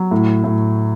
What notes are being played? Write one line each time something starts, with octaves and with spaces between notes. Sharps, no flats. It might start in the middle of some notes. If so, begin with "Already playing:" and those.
Already playing: F#3
A2
A2